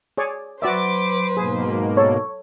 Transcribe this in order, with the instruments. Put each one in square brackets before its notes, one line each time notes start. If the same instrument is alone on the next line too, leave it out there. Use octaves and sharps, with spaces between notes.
[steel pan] G#4 C#5 D5
[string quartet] F#3 B4 C5 [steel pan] F#4 D5 E5 [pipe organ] D6
[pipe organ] G#2 B2 A#3 [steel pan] G#4
[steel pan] A4 [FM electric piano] C#5